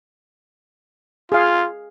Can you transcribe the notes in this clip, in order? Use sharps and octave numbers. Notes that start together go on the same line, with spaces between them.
F4 G#4 F5